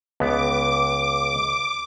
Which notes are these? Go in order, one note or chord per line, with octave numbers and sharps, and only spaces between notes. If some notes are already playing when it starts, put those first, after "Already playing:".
C#2 B3 D6